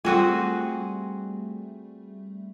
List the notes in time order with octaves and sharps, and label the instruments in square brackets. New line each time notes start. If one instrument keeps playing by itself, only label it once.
[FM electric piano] G3 A3 [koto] C4 F#4 G#4 [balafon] F4 G5